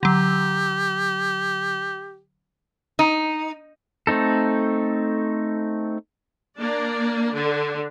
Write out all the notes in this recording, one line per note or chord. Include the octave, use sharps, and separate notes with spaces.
D3 F#3 G4
D#4
A3 C4 D#4 A4
A#3 D4 D5
D3